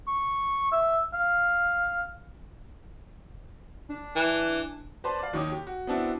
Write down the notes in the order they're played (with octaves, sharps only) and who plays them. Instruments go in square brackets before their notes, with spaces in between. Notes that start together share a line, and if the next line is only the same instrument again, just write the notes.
[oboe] C#6
E5
F5
[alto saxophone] D4
[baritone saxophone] E3
[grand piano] B4 C5 D5 A5 C6
D5 F5
D#2 D#3 C#5 D6 D#6
G4
F#4
B3 C4 D4 E4 F#4